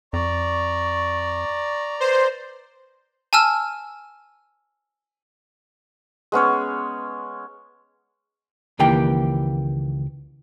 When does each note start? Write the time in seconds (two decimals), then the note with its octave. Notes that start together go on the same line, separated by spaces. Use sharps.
0.13 F2 D5 A#5 C#6
2.00 B4 C5
3.33 G#5 A5 E6 F6
6.32 G#3 B3 C#4 C#5
8.79 C#2 D#3 E3 A#3 G4 G5